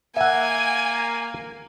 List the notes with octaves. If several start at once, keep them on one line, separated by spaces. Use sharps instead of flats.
A#3 E5 F#5 G#5